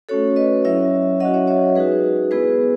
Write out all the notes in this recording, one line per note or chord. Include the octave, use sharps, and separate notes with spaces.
A3 C#4 F#4 A4 C#5
B4 D#5
F#3 C#4 E4 C#5 E5
F#3 C#4 F#4 D#5 F#5
C#5 E5
C#5 E5
G#3 D#4 F#4 G#4 B4
G#3 B3 E4 G#4 B4